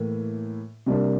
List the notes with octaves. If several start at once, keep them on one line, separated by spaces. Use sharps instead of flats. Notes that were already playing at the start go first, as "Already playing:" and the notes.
Already playing: A2 E3 A#3
C3 G3 A#3 D4